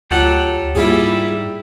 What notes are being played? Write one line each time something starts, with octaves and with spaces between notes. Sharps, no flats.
D2 F#3 F4 G4 A4 F#5
G#2 G3 A#3 E4 F4 G#4